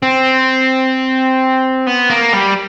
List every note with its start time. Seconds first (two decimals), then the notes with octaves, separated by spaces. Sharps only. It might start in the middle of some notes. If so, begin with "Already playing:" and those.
0.03 C4
1.87 B3
2.10 A#3
2.34 G3